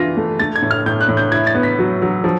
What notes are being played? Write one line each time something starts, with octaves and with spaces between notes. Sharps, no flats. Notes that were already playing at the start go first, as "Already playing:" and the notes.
Already playing: E3 F4 A#6
A3
A3 A6
G#6
A2
F6
A2 G6
F#6
A2
G6
E4 G#6
A6
B3
B6
F#3
F#3
F3